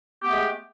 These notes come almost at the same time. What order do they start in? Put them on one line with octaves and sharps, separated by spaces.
G4 B3 A3 G#3